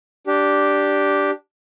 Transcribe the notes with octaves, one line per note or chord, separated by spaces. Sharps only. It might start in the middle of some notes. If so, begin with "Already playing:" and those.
D4 G4